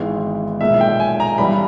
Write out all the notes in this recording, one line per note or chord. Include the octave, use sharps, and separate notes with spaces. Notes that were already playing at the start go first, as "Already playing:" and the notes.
Already playing: G#1 G#2 E3 G#3 B3
B1 A#2 G#3 E5
G5
G#5
A#5
G2 E3 G3 B3 B5